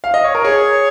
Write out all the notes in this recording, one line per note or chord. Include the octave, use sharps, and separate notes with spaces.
F5
D#5
C#5
A#4
G#4 C#5